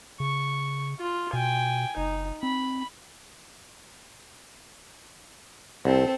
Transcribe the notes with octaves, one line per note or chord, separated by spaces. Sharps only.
C#3 C#6
F4
B2 G5 G#5
F#1 D#4
C4 B5
C2 C4 A4